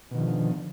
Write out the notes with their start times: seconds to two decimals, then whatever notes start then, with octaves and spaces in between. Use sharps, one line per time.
0.11 B2
0.14 D#3
0.18 F3
0.21 D3